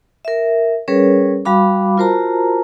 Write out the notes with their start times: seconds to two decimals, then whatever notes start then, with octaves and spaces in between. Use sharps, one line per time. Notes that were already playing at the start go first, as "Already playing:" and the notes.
0.25 A#4 E5
0.88 G3 C#4 G#4 A#4 B4 C#5
1.45 G3 F#4 F5 B5 D6
1.98 F4 F#4 A#4 C5 A5 A#5